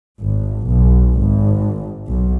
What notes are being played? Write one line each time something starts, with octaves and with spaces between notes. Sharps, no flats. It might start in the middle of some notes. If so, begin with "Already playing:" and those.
G#1
B1
G#1
B1